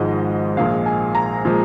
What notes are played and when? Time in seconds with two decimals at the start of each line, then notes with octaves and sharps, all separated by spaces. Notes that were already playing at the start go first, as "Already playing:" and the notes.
Already playing: G#1 G#2 F3 G#3 D#5
0.57 A#1 A#2 G#3 F5
0.86 G#5
1.15 A#5
1.45 A#2 F3 G#3